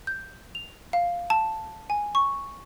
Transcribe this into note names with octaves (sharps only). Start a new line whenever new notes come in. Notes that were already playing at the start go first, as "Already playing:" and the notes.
G6
F7
F5
A5
G#5
C#6